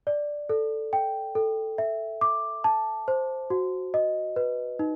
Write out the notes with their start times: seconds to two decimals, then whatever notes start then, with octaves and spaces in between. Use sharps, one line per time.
0.07 D5
0.49 A4
0.93 G5
1.35 A4
1.78 E5
2.21 D6
2.64 A5
3.08 C5
3.50 F#4
3.94 D#5
4.36 B4
4.79 D#4